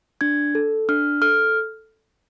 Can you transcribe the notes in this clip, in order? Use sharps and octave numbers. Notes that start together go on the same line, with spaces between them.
D4 G#6
A4
D4 F6
A4 F6